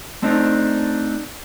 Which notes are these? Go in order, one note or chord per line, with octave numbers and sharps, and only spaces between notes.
A3 C4 D4 D#4